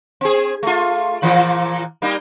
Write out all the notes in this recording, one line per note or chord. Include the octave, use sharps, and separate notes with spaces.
C4 G#4
A3 F4
A#2 E3 F3
G3 A#3 D#4